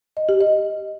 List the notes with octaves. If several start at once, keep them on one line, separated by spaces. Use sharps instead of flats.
D#5
G4
D#5